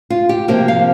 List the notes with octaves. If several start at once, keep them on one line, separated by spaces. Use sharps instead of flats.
F4
G4
C3 F3 A#3 G4
F5